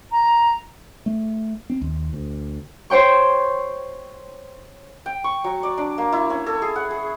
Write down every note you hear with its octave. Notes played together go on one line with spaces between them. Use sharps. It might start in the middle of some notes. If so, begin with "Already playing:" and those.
A#5
A3
C4
D#2
D2
C5 C#5 G5 C#6
G5
C#6
F#3
D5
D4
A#3
E4
C#4
A4
G#4
F#5
G#4